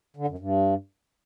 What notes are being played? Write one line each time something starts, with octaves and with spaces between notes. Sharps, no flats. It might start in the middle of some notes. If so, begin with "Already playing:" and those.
D3
F#2
G2